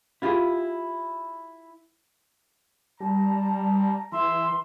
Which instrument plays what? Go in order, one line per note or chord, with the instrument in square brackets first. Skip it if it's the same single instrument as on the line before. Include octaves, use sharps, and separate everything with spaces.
[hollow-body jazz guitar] E4 F4 G4 G#4
[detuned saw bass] G3 [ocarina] A5 [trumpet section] A#5
[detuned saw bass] E3 [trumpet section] G#4 E5 [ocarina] C6